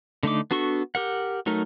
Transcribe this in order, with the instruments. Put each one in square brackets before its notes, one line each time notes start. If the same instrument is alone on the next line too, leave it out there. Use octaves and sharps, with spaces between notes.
[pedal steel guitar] D3 A3 D#4 D6
B3 D4 F#4 A4 C#6
G4 A#4 F#5
F#3 A3 D#4 A#4